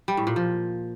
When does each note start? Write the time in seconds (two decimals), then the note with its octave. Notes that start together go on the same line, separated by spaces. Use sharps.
0.08 G3
0.17 A2
0.27 A#2
0.36 F3